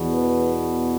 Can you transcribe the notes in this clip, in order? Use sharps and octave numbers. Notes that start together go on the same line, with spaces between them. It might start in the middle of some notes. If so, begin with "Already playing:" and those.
Already playing: E2 B2
B4